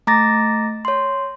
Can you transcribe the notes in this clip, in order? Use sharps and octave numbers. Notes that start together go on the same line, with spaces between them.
A3 A#5 D6 A6 A#6
C#5 C6